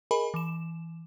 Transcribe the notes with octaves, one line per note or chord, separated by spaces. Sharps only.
G#4 A#4 D#5 G#5 B5
E3 E7